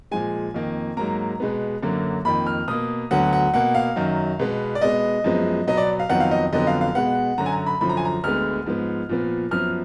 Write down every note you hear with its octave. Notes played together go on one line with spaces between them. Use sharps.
A#2 F3 G#3 G#5
F2 D#3 A#3
G#2 F#3 A#3 A#5
B2 G#3 B3
F#2 D3 F#3 A#3
F2 D#3 A#3 B5
F6
B2 A#3 D#6
D2 D3 F#3 B3 F#5
F#5
B2 A#3 F#5
F5
F#2 D#3 F#3
B2 G#3 B3
D5
B2 G#3 B3 D#5
F#2 F3 G#3 B3
B2 F#3 B3 D#5
D5
F5
F2 D#3 F#3 B3 F#5
F5
D#5
F2 D3 F#3 B3 D#5
F5
F5
B2 G#3 B3 F#5
F#2 D3 F#3 A#5
G#5
A#5
B5
F#2 D3 F3 B5
A#5
G#5
A#5
D2 D3 G#3 B3 F6
G#2 F3 B3
A#2 F3 B3
F#2 F3 B3 F6